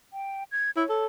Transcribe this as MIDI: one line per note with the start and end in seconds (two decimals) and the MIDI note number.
0.13 0.44 79
0.52 0.71 92
0.76 0.84 64
0.76 1.06 73
0.89 1.07 69